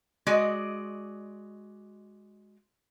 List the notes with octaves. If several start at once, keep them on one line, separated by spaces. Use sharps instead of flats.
G#3 F#4 D5 D#5